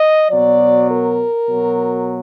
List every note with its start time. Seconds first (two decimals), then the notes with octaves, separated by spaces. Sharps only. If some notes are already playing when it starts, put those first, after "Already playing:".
Already playing: D#5
0.29 B2 F#3 D5
0.89 A#4
1.47 B2 F#3